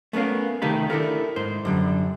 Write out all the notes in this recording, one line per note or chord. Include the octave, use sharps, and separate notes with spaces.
A3 B3 C#4 A#4 F5
C3 D#3 A3 G4 F5 B5
D4 E4 A4 A#4
G#2 C5
F#2 D3 G3